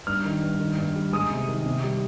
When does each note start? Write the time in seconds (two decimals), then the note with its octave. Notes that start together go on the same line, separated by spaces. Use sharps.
0.07 G2 F6
0.25 D#3
0.42 G2
0.60 D#3
0.78 G2
0.96 G3
1.13 G#3 D#6
1.30 C3
1.48 D#3
1.66 C3
1.84 G3